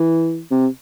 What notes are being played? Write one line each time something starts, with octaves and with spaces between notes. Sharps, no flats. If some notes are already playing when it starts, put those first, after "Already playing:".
Already playing: E3
C3